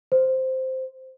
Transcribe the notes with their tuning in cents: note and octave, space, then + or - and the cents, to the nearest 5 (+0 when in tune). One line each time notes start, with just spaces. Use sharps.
C5 -5